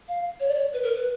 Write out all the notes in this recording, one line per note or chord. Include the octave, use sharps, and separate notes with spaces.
F5
C#5
D5
C#5
B4
A#4
B4